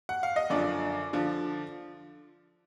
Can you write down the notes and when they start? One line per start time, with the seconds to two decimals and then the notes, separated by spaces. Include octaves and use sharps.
0.09 F#5
0.23 F5
0.36 D#5
0.50 F#2 D3 F3 D5
1.13 D3 F3